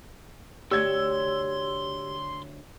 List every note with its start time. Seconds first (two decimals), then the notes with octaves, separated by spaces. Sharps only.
0.71 D2 G4 C#5 D5 C6 E6 G#6